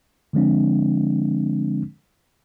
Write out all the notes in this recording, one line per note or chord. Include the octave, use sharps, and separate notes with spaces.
D3 F3 G#3 C4 D4